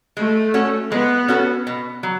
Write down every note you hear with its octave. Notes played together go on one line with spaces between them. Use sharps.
G#3 A3
C#4 F#4 A4
G#3 B3
C#4 F#4 A4
B2
F#3